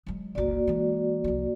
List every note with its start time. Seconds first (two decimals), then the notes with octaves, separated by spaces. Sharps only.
0.07 F#3 G#3
0.35 G1 C#2 A#3 F#4 D5
0.67 E3 G#3
1.24 C2 F3